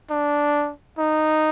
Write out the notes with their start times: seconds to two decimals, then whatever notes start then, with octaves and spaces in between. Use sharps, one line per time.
0.10 D4
0.98 D#4